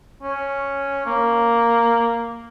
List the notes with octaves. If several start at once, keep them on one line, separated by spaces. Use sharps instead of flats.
C#4
A#3